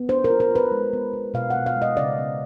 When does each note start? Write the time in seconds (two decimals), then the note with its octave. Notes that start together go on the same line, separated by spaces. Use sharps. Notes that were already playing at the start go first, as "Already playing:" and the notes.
Already playing: B3
0.09 D4 C5
0.24 A#4
0.30 F4
0.40 A#4
0.51 F4 B4
0.71 G#3
0.93 B3
1.13 B3
1.34 B2 F5
1.50 F#5
1.56 B3
1.66 F5
1.76 G#3
1.82 D#5
1.97 C#3 D5
2.18 B3